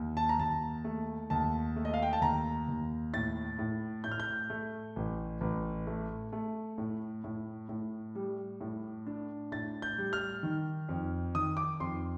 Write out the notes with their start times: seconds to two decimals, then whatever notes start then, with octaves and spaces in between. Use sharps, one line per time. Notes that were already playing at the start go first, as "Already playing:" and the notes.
Already playing: D#2
0.17 A5
0.29 A#5
0.39 D#2 A5
0.84 A3
1.30 D#2 A5
1.76 A3
1.85 D#5
1.94 F5
2.03 G5
2.13 A5
2.21 D#2 A#5
2.68 D#2
3.14 A2 A6
3.59 A2
4.04 A2 G6
4.11 F6
4.20 G6
4.50 A3
4.96 A1
5.41 A1
5.87 A3
6.33 A3
6.78 A2
7.24 A2
7.69 A2
8.15 G3
8.61 A2
9.07 D4
9.52 A2 A6
9.82 G6
9.98 G3
10.13 F6
10.43 D#3
10.89 F2
11.35 D#3 D#6
11.57 D6
11.80 F2 C6